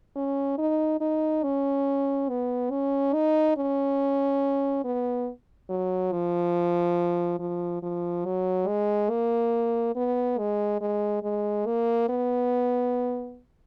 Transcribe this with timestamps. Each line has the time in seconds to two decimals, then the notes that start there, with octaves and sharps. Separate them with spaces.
0.16 C#4
0.58 D#4
1.01 D#4
1.43 C#4
2.29 B3
2.71 C#4
3.13 D#4
3.57 C#4
4.84 B3
5.69 F#3
6.12 F3
7.39 F3
7.82 F3
8.25 F#3
8.68 G#3
9.10 A#3
9.96 B3
10.38 G#3
10.81 G#3
11.23 G#3
11.66 A#3
12.09 B3